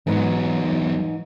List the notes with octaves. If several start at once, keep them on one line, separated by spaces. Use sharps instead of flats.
E2 G#2 F#3 D#4 B4